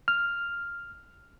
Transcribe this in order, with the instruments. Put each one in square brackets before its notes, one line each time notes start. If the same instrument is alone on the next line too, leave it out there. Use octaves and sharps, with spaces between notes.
[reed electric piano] F6